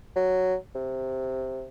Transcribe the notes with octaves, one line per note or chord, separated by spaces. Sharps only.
F#3
C3